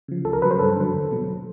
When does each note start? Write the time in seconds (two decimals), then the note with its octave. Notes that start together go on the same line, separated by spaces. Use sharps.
0.08 C#3 F3
0.25 C#2 A4
0.33 A#4
0.42 C#3 F#3 B4
0.51 C5
0.59 G2 A4
0.76 D3 F#3
0.93 E2
1.11 B2 F#3